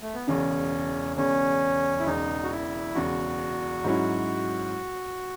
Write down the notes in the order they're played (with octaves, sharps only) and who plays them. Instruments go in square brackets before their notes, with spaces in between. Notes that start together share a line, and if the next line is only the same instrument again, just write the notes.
[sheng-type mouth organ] A3
B3
[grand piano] E1 E2 C#3 [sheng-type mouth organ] C#4
[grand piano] E1 E2 C#3 [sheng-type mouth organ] C#4
[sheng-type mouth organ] E4
[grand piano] E1 E2 C#3 [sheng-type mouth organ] D#4
[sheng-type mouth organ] F#4
E4
[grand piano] E1 E2 C#3 [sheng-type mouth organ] F#4
[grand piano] G#2 F#3 C#4 E4